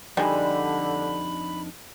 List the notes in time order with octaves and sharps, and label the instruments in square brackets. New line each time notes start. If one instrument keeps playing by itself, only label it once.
[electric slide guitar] F2 D4 D#4 [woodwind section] D3 [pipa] G3 G#3 [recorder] B5